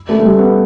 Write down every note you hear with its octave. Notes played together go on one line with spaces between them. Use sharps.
A3
A3
G3
B3